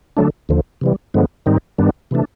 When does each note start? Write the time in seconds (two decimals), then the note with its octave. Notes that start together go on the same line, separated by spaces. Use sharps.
0.17 D3 F#3 A3 D4
0.49 D#2 D3 F3
0.81 C3 E3 G3
1.14 G2 D3 F3 G#3 B3
1.46 G#2 D#3 G3 C4 D#4
1.78 G2 D#3 G3 B3 D4
2.11 C3 E3 A3 D4